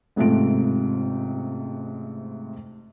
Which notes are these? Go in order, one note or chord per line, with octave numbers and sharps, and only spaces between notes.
A1 G#2 C3 A3 F4 D7